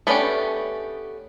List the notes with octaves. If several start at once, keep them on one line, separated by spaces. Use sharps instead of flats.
A3 B3 C#4 D4 G4